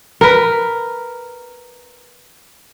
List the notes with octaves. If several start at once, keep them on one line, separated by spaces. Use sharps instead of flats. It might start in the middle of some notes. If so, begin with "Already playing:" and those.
A#4 B4